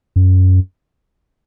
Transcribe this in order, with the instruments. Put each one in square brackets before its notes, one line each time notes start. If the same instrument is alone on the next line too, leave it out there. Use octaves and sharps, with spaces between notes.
[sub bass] F#2